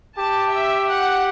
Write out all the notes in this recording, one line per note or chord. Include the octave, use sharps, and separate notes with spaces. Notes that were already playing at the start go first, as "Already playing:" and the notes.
G4 A5
E5
F#5